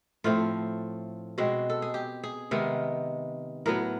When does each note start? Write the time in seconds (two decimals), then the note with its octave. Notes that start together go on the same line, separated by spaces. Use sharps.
0.24 A2 F3 A3 C4 F4
1.38 B2 G#3 C4 F#4
1.70 A4
1.82 G#4
1.94 G4
2.24 G#4
2.51 C3 D#3 G#3 B3 A#4
3.66 A2 F#3 B3 A#4